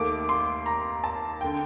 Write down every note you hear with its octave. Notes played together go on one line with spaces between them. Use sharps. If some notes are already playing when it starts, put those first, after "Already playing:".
Already playing: D#2 D#3 A3 D6
C6
A#5
A5
D3 G5